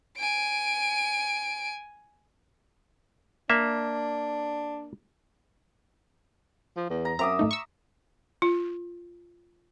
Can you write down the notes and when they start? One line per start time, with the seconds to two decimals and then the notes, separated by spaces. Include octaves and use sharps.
0.17 G#5 D7
3.50 A#3 D4 E5
6.77 F3
6.90 E2
7.05 A#5
7.19 F#2 C4 E5 A#5 D6 D#6
7.39 A1 A3 D#4
7.51 C#6 E6
8.42 F4